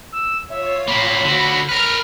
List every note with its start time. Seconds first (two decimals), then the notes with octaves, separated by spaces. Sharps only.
0.13 E6
0.50 F4 C#5 E5
0.88 A2 A#3 B5
1.25 D3 F#4
1.69 A#4 B4 F6